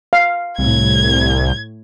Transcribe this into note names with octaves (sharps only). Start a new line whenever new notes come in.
F5
C2 A2 G#6